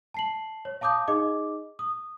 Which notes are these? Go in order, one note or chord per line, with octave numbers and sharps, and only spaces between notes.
A5 C7 F#7
C#5
F5 A5 D6 D#6 G6
D#4 G#4 D#5 D6
D#6